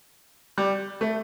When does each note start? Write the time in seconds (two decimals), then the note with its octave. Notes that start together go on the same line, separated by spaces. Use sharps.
0.58 G3
1.01 A3